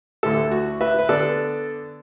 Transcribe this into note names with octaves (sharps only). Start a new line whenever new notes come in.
D2 D3 A3 E4 A4
F#4
B4 E5
B4
D3 B3 D4 A4 D5